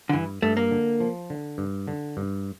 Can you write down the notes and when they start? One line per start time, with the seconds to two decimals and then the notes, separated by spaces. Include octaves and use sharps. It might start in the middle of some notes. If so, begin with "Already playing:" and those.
0.09 D3
0.13 G2 E3
0.42 G2 A3
0.57 A#3
0.71 D3
1.00 F3
1.30 D3
1.58 G2
1.87 D3
2.17 G2